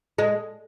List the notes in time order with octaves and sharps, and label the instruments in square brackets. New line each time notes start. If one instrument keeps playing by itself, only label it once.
[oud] G#3